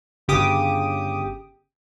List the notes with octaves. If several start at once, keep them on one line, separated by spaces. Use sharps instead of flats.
G1 C#3 G4 D6 D#6